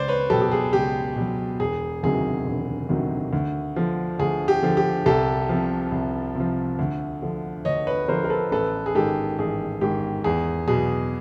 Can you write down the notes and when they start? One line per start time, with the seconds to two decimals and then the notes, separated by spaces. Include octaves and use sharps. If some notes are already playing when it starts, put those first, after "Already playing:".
Already playing: C#2 C5 D5
0.08 B4 C#5
0.30 B2 F#3 G4 A4
0.42 G4
0.52 G#4
0.73 C#2 G4
1.16 B2 F#3
1.60 E1 G#4
2.03 D2 C3 D#3 F#3 G#4
2.46 E1
2.89 D2 C3 D#3 F#3
3.33 D2
3.76 D3 F3
4.19 D2 G#4
4.48 G4
4.62 D3 F3
4.77 G4
5.06 C2 G4 A4
5.49 C3 F3
5.92 C2
6.35 C3 F3
6.79 D2
7.22 D3 F3
7.65 D2 C#5 D#5
7.87 B4 C#5
8.08 D3 F3 A#4 C5
8.24 A#4
8.30 A4 B4
8.51 A1 A4 B4
8.86 G#4
8.95 G#2 D#3 G4 A4
9.39 A1 G#4
9.81 G#2 D#3 G4
10.24 E2 G#4
10.67 B2 F#3 G#4